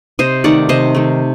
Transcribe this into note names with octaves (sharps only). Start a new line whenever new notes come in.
C3 C5 D#5
D#3 A3 D5 F#5
C3 C5 D#5
D#3 A3